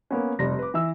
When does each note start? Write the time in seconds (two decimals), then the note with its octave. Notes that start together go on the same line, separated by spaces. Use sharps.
0.11 A#3 B3 C#4
0.39 F1 G3 A#6
0.59 B4 D6
0.74 E3 E5 E6